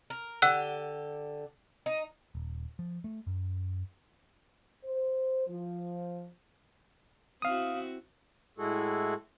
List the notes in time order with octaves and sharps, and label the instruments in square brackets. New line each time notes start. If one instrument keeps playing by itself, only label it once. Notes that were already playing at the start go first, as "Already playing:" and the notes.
[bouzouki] A#4
[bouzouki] D3 G4 [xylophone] F#5 E6 F#6
[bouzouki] D#4
[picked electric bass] D#1
F3
A3
F#2
[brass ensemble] C5
F3
[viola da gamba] C4 E4 F#4 [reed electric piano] F5 D#6
[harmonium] A2 G#3 E4 F#4 G#4 A4